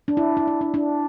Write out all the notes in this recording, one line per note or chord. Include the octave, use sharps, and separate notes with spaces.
D4
E4
E4
E4
D4
D4